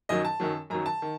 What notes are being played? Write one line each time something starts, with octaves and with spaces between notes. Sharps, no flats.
F#2 D#3 F#3 D#5
A5
F#2 D#3 F#3
F#2 D#3 F#3 A#5
A5
D#3